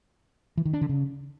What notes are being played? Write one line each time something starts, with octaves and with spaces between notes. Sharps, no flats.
E3
D#3
D4
D3
C#3